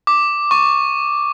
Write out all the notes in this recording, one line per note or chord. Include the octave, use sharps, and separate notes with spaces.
D6
C#6